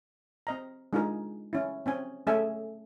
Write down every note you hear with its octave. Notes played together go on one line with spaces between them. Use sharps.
C4 D#5 A#5
G#3 D4 D#4 F4 G#4 A#4
C#4 E4
C4 C#4 G#5
A3 C#4 G#4 A4 E5 G#5